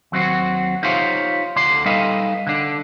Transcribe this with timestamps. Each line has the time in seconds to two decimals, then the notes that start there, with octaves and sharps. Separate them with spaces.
0.12 D#2 F#3 C4 F#4
0.83 D#4 F4 G4 C5 C#5 F5
1.56 D2 D3 D5 C6
1.86 G3 D#4 A4 B4 D#5 F5
2.47 D3 D4